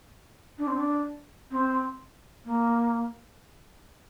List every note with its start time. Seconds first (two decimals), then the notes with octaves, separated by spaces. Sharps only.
0.58 D4
0.67 C4
0.77 D4
1.51 C4
2.44 A#3